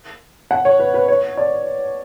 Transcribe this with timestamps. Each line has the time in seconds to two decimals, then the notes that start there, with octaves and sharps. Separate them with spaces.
0.51 F#5
0.65 C#5
0.80 B4
0.94 B4
1.08 C#5
1.37 D5